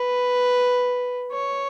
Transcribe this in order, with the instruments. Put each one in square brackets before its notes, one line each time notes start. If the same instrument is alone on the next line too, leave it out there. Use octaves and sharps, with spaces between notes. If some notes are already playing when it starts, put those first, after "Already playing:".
Already playing: [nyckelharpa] B4
C#5